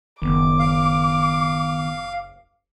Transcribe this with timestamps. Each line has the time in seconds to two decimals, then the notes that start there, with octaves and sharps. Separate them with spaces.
0.22 F#1 D#3 B3 D6
0.59 F5